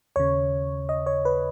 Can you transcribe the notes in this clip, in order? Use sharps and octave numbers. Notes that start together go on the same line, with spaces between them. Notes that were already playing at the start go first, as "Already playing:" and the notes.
D#2 C#3 C#5
D#5
C#5
B4